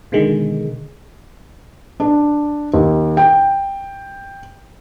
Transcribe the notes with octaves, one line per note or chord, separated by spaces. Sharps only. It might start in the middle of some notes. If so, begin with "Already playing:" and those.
B2 D3 D#3 G#3
D4
D#2
G5